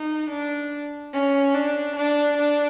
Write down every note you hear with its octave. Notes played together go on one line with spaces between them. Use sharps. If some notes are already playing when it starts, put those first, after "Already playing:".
Already playing: D#4
D4
C#4
D4
D4
D4